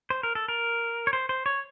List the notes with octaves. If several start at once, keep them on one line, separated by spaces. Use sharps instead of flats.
C5
A#4
A4
A#4
C#5
C5
C5
C#5